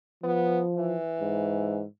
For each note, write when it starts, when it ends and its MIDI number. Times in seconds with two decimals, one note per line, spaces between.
0.23 0.97 53
0.23 0.60 59
0.76 1.82 52
1.21 1.85 44